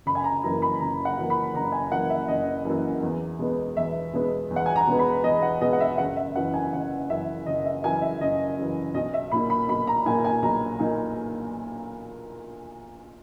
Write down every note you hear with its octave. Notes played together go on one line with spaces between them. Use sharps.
F#1 B5
G#5
A#5
F#2 E3 A#3 A#5
B5
F#1 A#5
F#5
F#2 E3 A#3
B5
F#1 A#5
G#5
F#2 E3 A#3 F#5
E5
F#1 D#5
F#2 E3 A#3
E2
B2 G#3 B3
E2 E5
B2 G#3 B3
E2
F#5
G#5
A#5
B2 G#3 B3
B5
E2 D#5
F#5
B2 G#3 B3 D#5
F#5
E5
F#1 F#5
E5
F#2 E3 F#5
G#5
F#1 F#5
F#2 E3 E5
F#1 D#5
E5
F#2 E3 G#5
E5
F#1 D#5
F#2 E3
B1 D#5
E5
A#2 A#3 D#4 B5
B5
B1 B5
A#5
A#2 A#3 D#4 G#5
G#5
B1 A#5
A#2 A#3 D#4